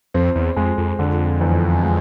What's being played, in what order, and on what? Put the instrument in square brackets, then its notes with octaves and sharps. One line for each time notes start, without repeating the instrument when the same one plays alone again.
[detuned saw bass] F2 [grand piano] C4
[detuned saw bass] E2
[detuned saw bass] F2 [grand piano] G#3
[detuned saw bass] F2
[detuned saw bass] F2 [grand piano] D3
[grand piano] E2
G#3